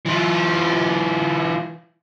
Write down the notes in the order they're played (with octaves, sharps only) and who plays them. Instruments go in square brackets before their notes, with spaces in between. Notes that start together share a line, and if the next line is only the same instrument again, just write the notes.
[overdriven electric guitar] E3 F4